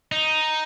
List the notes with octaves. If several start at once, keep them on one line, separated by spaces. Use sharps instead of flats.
D#4